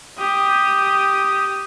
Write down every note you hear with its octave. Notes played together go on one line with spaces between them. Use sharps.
G4 D#6